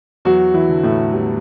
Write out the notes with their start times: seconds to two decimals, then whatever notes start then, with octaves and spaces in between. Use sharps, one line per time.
0.25 E2 F#3 F#4
0.54 E3 E4
0.69 D3
0.83 A2 A3
1.12 E2 G3